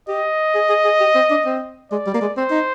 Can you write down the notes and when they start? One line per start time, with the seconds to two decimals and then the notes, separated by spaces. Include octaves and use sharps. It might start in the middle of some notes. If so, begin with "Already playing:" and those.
0.08 G4 D#5
0.54 G#4
0.69 G#4
0.85 G#4
1.00 G4
1.15 C4
1.30 D4
1.46 C4
1.91 G#3 D5
2.07 G3
2.14 A#3
2.21 G#3
2.37 C4 C5
2.50 D#4